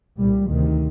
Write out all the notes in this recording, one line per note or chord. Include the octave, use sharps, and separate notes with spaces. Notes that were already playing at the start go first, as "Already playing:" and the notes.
C2 A#2 G3
D2 C3 D#3